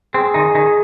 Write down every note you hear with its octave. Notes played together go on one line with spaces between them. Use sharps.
C4 G#4
D#3 D#4
D#3 D#4